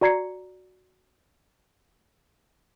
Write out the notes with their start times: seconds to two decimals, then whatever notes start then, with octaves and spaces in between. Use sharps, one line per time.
0.01 F#4 D5 A#5 G#6 C7 C#7